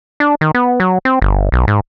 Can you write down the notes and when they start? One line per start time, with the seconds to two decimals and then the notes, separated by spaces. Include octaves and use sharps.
0.20 D4
0.41 D#3
0.54 B3
0.80 F#3
1.05 C4
1.22 G1
1.52 B1
1.68 G#2